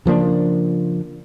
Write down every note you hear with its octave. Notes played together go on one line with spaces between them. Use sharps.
C#3 F3 A#3 D4